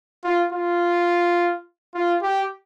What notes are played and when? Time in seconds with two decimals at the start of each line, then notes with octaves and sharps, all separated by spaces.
0.24 F4
0.52 F4
1.94 F4
2.22 G4